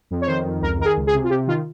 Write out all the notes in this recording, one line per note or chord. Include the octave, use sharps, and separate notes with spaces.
F2
C#5
D#3 C5
F2
C#2 A#4
D#3 A#4
G#4
C#2
G#4
C3
F4
C3 G4
D#3 F4